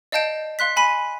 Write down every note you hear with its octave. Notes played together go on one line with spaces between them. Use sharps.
D5 D#5 F5 A5 G6 D7
F5 C6 F#6 B6
G#5 B5 B6 D#7